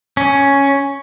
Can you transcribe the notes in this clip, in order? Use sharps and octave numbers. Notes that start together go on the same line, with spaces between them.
C#4